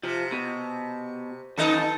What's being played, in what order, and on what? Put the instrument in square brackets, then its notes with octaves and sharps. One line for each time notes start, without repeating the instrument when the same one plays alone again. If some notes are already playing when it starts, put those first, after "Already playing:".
[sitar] C3 [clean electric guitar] F3
[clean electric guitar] B2
[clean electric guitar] F#2 D#5 [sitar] D#3 D#4 A4